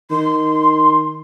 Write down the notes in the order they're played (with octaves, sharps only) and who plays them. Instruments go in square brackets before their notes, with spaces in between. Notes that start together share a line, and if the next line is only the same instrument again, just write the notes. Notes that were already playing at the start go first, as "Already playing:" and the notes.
[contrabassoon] D#3 [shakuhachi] C6